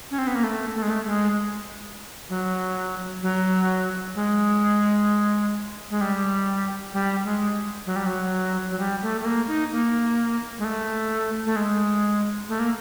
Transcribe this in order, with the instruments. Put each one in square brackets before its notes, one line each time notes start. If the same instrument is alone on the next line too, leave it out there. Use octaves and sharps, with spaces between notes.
[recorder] C#4
C4
B3
A#3
A3
A3
G#3
A3
G#3
F#3
F#3
G#3
G#3
G3
G3
G#3
F#3
G3
F#3
F#3
G3
A3
A3
A#3
D#4
A#3
G#3
A3
A3
G#3
A3
A#3